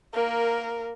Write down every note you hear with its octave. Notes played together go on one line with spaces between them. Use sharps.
A#3 A#4